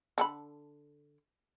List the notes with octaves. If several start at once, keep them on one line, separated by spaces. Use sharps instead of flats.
D3 A4 B5